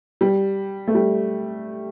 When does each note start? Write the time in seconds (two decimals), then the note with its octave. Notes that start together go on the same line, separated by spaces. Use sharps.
0.21 G3
0.88 A3
0.95 G3